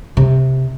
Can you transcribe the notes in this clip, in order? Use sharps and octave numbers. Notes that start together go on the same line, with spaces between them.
C3